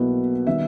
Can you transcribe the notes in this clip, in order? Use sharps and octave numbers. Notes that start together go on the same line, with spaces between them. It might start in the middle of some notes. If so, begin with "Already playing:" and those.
Already playing: B1 B2 A#3 E4 B4
D#3 G3 B3 E5